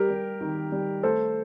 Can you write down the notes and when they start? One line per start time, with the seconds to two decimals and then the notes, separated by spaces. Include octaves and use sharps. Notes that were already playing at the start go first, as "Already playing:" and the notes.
Already playing: G3 G4 A#4
0.10 G3
0.41 D#3
0.72 G3
1.03 A3 A4 C5